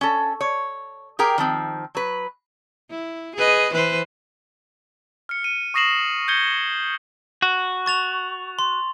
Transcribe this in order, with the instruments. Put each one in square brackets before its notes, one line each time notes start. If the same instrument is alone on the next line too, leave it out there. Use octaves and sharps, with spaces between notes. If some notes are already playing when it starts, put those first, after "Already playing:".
[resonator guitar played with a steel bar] C#4 A4
C#5
G4 G#4 A#4 G5
D#3 F3 C4
F#3 B4
[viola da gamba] E4
G#4 B4 D#5
E3 B4 C5
[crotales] F6 C#7
D#7
C#6 D#6 A#6 C7 E7 F#7
G6 G#6 C#7 G7
[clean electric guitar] F#4
[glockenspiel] C#6 A6 F7
C6